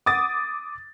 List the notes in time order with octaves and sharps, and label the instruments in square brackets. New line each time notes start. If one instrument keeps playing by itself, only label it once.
[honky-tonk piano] D6 D#6 A6